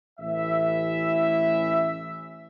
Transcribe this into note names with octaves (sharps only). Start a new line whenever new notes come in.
A1 E3 E5